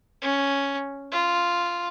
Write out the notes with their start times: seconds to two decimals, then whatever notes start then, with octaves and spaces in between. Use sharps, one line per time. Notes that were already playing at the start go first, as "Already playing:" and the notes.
0.22 C#4
1.11 F4